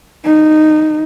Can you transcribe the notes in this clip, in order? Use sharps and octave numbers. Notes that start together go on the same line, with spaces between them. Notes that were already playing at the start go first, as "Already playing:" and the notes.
D#4